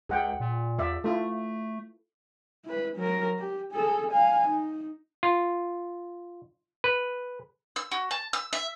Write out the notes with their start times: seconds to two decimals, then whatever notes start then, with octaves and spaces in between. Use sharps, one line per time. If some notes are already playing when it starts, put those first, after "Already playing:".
0.09 C#2 G#4 F#5 G5
0.40 A#2
0.78 E2 F4 D5 E5
1.04 A3 E4 F4 A4
2.65 E4 B4
2.95 F#3 A#4
3.39 G4
3.72 G#4 A4
4.12 F5 G#5
4.48 D#4
5.23 F4
6.84 B4
7.76 E6
7.91 F#4
8.11 A5
8.33 E6
8.53 E5